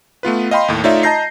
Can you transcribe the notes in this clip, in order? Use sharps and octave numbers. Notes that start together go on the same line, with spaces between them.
A3 B3 F4 B4
D#5 F5 G5 B5 C6
D#2 A2
A3 D#4 F4 C#5 D5 E5
D#5 A5 A#5 G6 A#6 C7